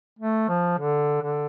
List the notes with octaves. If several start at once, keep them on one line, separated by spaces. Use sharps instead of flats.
A3
F3
D3
D3